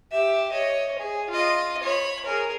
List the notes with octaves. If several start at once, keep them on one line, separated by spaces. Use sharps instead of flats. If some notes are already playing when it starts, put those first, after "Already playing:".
G4 E5
C#5 D#5
G#4
F4 D#5
C#5 B5
G#4 A#4